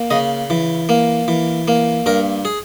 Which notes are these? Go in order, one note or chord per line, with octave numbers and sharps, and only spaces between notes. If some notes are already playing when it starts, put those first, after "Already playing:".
Already playing: A#3
C#3 D#5
E3
A#3
E3
A#3
G2 A#4
G#4